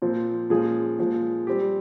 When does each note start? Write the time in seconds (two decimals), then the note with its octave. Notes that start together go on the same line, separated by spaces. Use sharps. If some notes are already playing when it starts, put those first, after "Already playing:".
0.02 A#2 F3 C4
0.50 A#2 F3 G#3 C#4 G#4
0.98 A#2 F3 G#3
1.47 G3 C4 G4